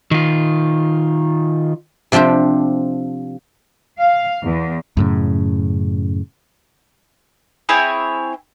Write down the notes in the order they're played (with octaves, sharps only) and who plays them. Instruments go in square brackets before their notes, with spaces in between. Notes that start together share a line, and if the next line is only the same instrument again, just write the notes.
[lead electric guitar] D#3 F4
[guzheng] C3 F3 C4 D4 G4
[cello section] F5
E2
[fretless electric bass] F#2 A2 C#3
[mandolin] C4 E4 G#4 C#5